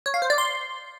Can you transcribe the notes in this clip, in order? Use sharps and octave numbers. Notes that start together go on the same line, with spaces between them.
C#5
F5
C5
D5
C6